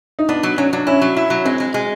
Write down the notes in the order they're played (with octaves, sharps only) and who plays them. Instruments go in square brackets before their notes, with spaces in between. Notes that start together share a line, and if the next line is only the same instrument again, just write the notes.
[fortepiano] D#4
[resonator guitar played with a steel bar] B3 [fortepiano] D4
[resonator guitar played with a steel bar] F#3
[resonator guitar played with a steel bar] F#3 [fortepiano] C#4
[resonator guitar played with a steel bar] F#3 [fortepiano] D4
[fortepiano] C#4 [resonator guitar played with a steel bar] E4
[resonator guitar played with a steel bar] F#3
E4
F#3
[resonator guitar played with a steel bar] G#3 [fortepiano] C4
[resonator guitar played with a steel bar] G#3
G#3